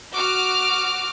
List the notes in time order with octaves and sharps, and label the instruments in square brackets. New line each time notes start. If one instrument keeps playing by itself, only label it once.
[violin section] F#4 D6 F6